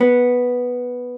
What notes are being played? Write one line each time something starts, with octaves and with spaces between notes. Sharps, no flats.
B3